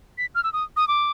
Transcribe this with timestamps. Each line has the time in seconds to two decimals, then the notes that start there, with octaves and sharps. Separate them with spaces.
0.18 B6
0.35 F6
0.44 E6
0.53 D#6
0.77 D#6
0.88 D6